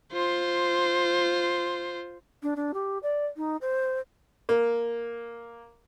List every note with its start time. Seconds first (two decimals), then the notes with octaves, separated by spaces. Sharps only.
0.13 F4 C5
2.43 D4
2.56 D4
2.74 G4
3.03 D5
3.37 D#4
3.61 C5
4.49 A#3